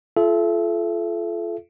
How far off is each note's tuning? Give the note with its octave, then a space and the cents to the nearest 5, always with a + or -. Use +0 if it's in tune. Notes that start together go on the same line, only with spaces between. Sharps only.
F4 -20 A4 -30 E5 +30